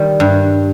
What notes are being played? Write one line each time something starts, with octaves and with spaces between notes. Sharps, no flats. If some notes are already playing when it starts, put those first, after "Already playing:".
Already playing: D#3 G3
G2